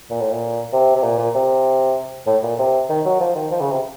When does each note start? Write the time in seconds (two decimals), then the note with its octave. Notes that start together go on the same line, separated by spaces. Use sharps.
0.10 A#2
0.20 A2
0.31 A#2
0.72 C3
0.95 C3
1.03 A#2
1.18 A#2
1.35 C3
2.27 A2
2.43 A#2
2.59 C3
2.89 D#3
3.05 F#3
3.20 F3
3.35 D#3
3.51 F3
3.61 C#3
3.71 C3